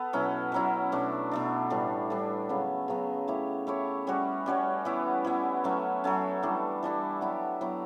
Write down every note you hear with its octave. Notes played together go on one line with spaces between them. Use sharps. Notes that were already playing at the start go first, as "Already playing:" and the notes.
Already playing: B3 A4
B2 F#3 C#4 E4
B2 F#3 C#4 E4
B2 A3 D4
B2 A3 D4
A2 E3 G3 D4
A2 E3 G3 D4
C#3 F#3 B3
C#3 F#3 B3
A3 E4 G4 C#5
A3 E4 G4 C#5
G3 C#4 F#4 C#5
G3 C#4 F#4 C#5
E3 B3 E4
E3 B3 E4
F#3 A3 C#4
F#3 A3 C#4
E3 G3 D4 A4
E3 G3 D4 A4
F#3 B3 E4 G4
F#3 B3 E4 G4